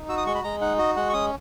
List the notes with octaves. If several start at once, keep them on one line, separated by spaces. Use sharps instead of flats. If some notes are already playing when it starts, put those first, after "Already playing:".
Already playing: D#4
F#4 E6
D#6
G#3 C#6
B5
G#3 A#5
D#4 F#5
F#4 D#5
G#3 F#5
C#6
C#4 D#6